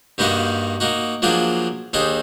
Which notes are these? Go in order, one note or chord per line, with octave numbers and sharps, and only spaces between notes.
G2 G3 A#3 D#4 F#4 F5
A#3 D#4 F#4
F3 F#3 A#3 D4 G#4 C5
D#2 D4 D#4 G#4 C5